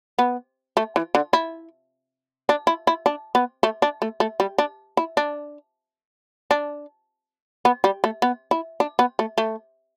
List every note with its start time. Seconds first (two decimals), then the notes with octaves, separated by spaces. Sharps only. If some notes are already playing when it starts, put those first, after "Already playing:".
0.19 B3
0.77 A3
0.96 E3
1.15 D3
1.33 E4
2.49 D4
2.67 E4
2.87 E4
3.06 D4
3.35 B3
3.63 A3
3.82 D4
4.02 A3
4.20 A3
4.40 G3
4.58 D4
4.97 E4
5.17 D4
6.51 D4
7.65 B3
7.84 G3
8.04 A3
8.22 B3
8.51 E4
8.80 D4
8.99 B3
9.19 A3
9.38 A3